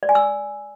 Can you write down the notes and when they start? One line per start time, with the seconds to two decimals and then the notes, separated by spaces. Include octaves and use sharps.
0.03 D5
0.09 G#5
0.15 E6